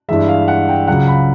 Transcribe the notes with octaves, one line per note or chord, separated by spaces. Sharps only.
G2 E3 G#3 E5
F5
F#5
G5
C#2 C#3 F#3 F#5
B5